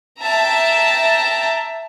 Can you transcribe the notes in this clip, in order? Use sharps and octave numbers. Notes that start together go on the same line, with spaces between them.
E5 G5 A5 A#5